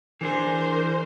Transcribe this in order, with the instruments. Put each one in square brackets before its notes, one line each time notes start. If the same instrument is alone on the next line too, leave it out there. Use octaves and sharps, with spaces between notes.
[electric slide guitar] E3 D4 G#4 [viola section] A#4 C5